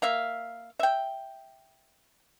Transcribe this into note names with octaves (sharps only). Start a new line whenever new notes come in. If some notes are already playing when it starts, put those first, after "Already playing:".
A#3 E5 F5
E5 G5